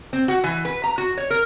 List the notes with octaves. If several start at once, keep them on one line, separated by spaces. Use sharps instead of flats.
C4
F#4
E3
B4
A#5
F#4
C#5
A#4